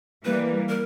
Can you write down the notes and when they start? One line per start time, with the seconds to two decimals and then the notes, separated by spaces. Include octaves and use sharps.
0.25 E3 G3 A#3 B4
0.69 A#4